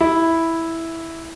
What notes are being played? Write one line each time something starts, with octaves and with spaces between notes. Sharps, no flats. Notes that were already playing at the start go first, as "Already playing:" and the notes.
E4